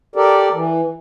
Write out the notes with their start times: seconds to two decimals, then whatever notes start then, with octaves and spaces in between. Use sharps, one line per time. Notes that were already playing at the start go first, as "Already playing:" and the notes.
0.16 G4 A4 A#4 D5
0.53 E3